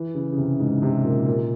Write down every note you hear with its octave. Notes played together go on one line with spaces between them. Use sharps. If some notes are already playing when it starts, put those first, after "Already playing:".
Already playing: E3
C#3
C#3
C3
G#2
C3
A#2
A#2